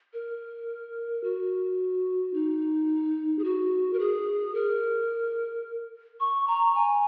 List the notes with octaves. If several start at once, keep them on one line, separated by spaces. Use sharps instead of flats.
A#4
F#4
D#4
G#4
F#4
A#4
G#4
A#4
C#6
A#5
G#5